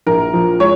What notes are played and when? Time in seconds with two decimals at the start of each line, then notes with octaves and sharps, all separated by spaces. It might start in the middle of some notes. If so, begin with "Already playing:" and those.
0.06 A#1 A#4
0.33 F3
0.60 G#3 C#5